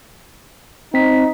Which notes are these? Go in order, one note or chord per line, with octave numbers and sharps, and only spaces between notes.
C4 D#4 B6